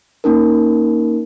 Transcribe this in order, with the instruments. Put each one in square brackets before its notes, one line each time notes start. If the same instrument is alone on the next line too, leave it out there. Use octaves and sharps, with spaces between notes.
[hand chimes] A#3 C#4 D#4 A#4